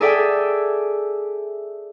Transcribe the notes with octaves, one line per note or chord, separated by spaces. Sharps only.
G#4 A4 D5 E5 G5 G#5